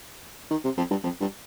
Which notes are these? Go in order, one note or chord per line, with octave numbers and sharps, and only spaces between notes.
D#3
C3
F2
G2
F2
G2